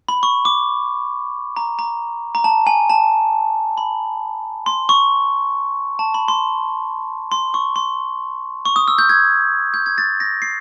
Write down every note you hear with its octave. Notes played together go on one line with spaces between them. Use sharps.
B5
C#6
D6
A#5
A#5
A#5
A5
G#5
A5
B5
C6
C#6
A5
B5
C6
C6
C#6
C6
C#6
D#6
E6
G6
G#6
G6
G#6
A6
A#6
C7